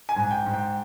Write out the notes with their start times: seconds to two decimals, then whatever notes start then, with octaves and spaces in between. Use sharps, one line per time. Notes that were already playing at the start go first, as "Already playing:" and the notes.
0.09 G#5
0.16 G#2
0.31 G5
0.46 G#2
0.54 G5